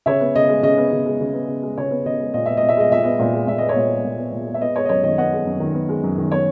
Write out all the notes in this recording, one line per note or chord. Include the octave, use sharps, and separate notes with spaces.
C#3 C#5 E5
B3
C#3 D#5
G#3
C#3 D#5
B3
C#3
G#3
C#3
B3
C#3
G#3
C#3 C#5
B3
C#3 D#5
G#3
A#2 D#5
B3 E5
D#5
A#2
E5
G#3 D#5
A#2 E5
B3 D#5
A#2
G#3
A#2 E5
B3 D#5
C#5
A#2 D#5
G#3
A#2
B3
A#2
G#3
E5
B3 D#5
G#3 C#5
D#5
F#2 C#5
D#3 D#5
B3 D#5 F#5
G#3
F#2
D#3
B3
G#3
F#2
D#3
B3 C#5